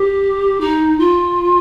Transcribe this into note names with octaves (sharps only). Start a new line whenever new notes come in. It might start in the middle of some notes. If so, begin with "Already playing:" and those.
Already playing: G4
D#4
F4